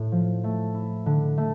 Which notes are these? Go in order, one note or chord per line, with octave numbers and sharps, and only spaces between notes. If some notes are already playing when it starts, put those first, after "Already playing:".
Already playing: A2
F3
A3
E4
D3
A3